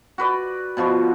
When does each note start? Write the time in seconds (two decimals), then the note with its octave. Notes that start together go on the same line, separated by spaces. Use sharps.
0.18 F#4 B4 D5
0.77 B2 F3 B3 F#4